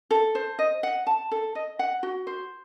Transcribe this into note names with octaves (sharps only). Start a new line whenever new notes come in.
A4
C5
D#5
F#5
A5
A4
D#5
F#5
F#4
C5